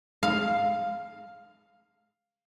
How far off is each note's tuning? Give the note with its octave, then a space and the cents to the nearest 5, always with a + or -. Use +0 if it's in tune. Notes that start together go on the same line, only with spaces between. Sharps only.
F5 +5